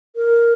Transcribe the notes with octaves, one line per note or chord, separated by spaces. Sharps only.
A#4